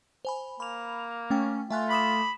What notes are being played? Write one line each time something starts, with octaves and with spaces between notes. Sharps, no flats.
C5 G#5 B5
A#3 B5 F7
A3 C#4 G5
A3 F4 E5 G#5 F#6
B5 D6 D#6 E7